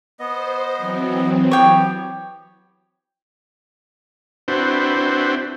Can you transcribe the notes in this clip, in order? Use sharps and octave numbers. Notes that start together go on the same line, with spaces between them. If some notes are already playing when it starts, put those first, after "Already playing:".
B3 C5 D#5
E3 F#3 C4
B3 G4 C#5 G5
C4 D4 E4 F#4 B4 C5